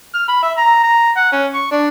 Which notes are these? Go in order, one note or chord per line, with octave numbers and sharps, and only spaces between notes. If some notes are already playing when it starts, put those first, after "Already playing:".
F6
B5
E5
A#5
A#5
F#5
C#4
C#6
D4